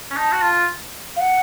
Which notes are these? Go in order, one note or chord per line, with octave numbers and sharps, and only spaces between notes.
C#4
D#4 A5
F#4
F4
F5
F#5